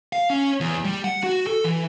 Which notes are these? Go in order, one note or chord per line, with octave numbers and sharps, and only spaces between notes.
F5
C#4
E2
G3
F#5
F#4
A4
E3